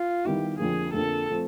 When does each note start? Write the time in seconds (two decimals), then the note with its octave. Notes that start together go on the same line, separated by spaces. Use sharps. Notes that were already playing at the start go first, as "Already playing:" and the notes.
Already playing: F4
0.25 D#3 G3 B3 E4 G4
0.59 F2 D3 F3 A#3 G#4
0.93 F2 D3 F3 A#3 A4
1.29 F3 A3 C4